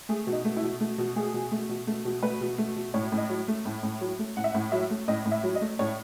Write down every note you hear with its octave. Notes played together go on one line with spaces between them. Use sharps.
A3 G#4
B2
D#4
A3
E4
B2
A3
B2
A3 G#4
B2
A3
B2
A3
B2
A3 B4
B2
A3
B2
A2 C#5
A2
D#5
F#3
A3
A2
A2
F#3
A3
A2 F#5
E5
F#5
A2
F#3 E5
A3
A2 D#5
A2
E5
F#3
D#5
A3
A2 C#5